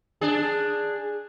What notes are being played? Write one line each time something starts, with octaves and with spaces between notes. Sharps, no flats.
D4 G#4